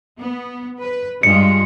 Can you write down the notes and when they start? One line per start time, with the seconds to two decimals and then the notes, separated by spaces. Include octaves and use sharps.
0.17 B3
0.79 B4
1.23 G2 G#3 F4 C#7